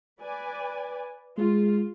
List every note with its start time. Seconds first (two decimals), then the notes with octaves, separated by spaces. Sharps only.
0.21 B4 D5 G#5
1.38 G#3 F4